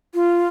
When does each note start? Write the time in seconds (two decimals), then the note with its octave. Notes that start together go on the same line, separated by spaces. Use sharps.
0.14 F4